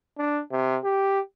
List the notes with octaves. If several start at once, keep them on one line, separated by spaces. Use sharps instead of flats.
D4
C3
G4